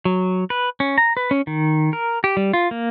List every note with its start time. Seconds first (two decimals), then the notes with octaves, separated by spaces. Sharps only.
0.05 F#3
0.50 B4
0.80 C#4
0.98 A#5
1.17 B4
1.31 C#4
1.47 D#3
1.93 A#4
2.24 G4
2.37 G3
2.53 F4
2.71 A#3